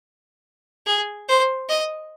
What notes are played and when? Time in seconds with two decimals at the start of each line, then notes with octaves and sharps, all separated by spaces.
0.86 G#4
1.28 C5
1.69 D#5